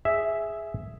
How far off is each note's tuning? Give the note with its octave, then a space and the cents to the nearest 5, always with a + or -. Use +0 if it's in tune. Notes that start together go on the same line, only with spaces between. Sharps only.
G#4 +0 E5 +0